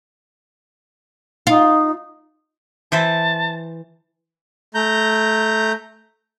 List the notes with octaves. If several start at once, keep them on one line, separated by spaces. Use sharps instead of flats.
D#4 F4
E3 C5 E5 A5
A3 A#5 G6